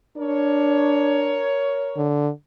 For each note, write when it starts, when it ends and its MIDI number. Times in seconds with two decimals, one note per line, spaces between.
0.17 1.45 62
0.17 2.08 70
0.17 2.08 73
1.97 2.29 50